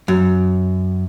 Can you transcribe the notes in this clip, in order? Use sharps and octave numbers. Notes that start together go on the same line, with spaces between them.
F#2